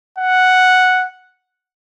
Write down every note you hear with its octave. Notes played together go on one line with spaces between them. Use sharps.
F#5